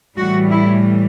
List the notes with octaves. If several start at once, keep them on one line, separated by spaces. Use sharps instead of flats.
A2 E3 G3 F#4
E4